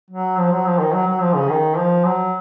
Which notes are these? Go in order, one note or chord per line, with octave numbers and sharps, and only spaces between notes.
F#3
F3
F#3
F3
D#3
F#3
F#3
F3
C#3
D#3
F3
F#3